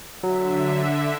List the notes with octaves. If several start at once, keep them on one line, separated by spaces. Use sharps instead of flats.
D3 F#3 E5